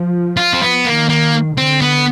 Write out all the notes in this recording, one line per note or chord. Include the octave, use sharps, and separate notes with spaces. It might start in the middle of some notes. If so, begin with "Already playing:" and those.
Already playing: F3
F4
C4
B3
D#3 A#3
A#3
D3 C4
B3